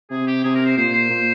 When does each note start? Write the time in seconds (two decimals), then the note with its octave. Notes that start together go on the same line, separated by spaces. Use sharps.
0.10 C3 G#4
0.27 G4
0.44 C3 G#4
0.55 A#4
0.66 C5
0.77 A#2 C5
0.93 C5
1.10 A#2